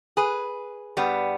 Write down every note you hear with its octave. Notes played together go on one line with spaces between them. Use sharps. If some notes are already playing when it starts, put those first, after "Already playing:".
G#4 B4
G2 G3 B3